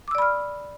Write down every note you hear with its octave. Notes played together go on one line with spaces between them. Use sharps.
D5 B5 D6 E6 F6